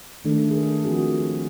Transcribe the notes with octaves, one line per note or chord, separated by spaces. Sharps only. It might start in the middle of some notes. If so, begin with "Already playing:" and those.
D#3 A3 D4 A4
G#4 A#4
F3 C4 F#4 G#4